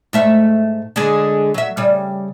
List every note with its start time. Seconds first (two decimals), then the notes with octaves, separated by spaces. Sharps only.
0.13 G#2 A3 E5
0.96 D3 G#3 G#4
1.54 F#3 E5
1.77 C#3 G3